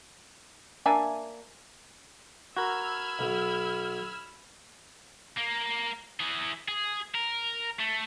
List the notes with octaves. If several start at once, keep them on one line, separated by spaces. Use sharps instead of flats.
A#3 D4 E5 G#5
F#4 A#4 B5 E6 F6 G#6
B1
A#3
E3 G#4
G#4
A#4
A3